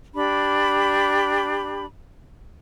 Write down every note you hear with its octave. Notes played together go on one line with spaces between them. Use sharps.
D4 G4 B5